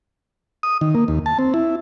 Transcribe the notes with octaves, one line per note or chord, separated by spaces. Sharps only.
D#6
D#3
A#3
D#2
A5
C4
E4